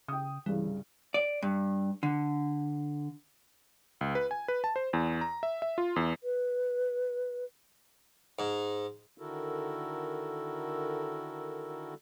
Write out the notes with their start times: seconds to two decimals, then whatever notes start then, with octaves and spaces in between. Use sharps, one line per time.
0.08 C#3 G5 D#6
0.46 C2 G2 C#3 E3
1.14 D5
1.42 G2
2.03 D3
4.01 C#2
4.15 B4
4.31 G#5
4.48 B4
4.64 A5
4.76 C5
4.93 E2
5.21 A#5
5.43 E5
5.62 E5
5.78 F4
5.96 E2
6.23 B4
8.39 G#2
9.18 D3 D#3 E4 F#4 A4 A#4